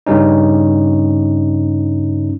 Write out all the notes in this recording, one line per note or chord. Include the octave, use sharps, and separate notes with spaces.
G2 C#3 G3 C#4 D#4